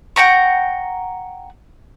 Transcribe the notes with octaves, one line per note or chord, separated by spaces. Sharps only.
F#5 G5 A#5 C#6